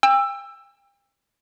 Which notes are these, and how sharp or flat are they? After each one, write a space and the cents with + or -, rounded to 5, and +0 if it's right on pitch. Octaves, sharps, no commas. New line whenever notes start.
G5 +40 E6 +15